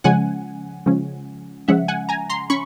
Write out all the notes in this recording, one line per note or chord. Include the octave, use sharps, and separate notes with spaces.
C#3 F3 G#3 C#4 F#5 G#5
C#3 F3 G#3 C#4
C#3 F3 G#3 C#4 E5 F#5
F#5 G#5
G#5 A#5
A#5 C6
C#4 B5 C#6